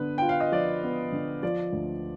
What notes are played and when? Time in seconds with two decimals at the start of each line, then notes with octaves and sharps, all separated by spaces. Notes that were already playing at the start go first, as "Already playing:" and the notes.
Already playing: D3 B3 B4
0.18 F4 G5
0.29 F5
0.40 D#5
0.52 F3 D5
0.83 B3
1.12 D3
1.43 F3 D5
1.73 D2